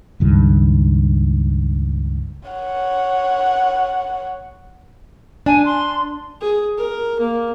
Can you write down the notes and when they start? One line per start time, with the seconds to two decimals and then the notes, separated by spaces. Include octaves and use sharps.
0.20 C#2 G2 D#3
2.49 C#5 F#5
5.46 D4 G#5
5.65 C6
6.41 G#4
6.77 A#4
7.20 A#3